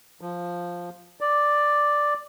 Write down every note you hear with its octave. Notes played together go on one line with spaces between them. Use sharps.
F3
D5